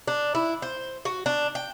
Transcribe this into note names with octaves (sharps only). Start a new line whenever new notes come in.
D4
E4
C5
F#4
D4
G5